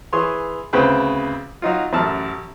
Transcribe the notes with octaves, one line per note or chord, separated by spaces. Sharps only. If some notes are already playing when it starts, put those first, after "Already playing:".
E3 G#4 C#5 C6
D2 C#3 C4 B4 G5
F#3 D#4 F4
A1 F#2 A5 F6